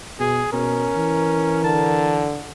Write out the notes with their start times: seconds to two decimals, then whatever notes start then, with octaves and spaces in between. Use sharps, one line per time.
0.20 B2 G#4
0.53 B2 C#4 A#4
0.95 E3
1.64 D3 A5